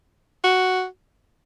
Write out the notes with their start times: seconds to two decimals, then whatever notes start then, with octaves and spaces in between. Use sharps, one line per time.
0.44 F#4